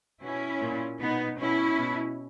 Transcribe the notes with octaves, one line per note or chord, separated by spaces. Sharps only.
B2 C#4 E4
A#2
B2 B3 D#4
B2 C#4 E4
B2